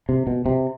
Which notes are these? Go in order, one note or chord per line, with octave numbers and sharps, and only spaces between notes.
C3
B2
C3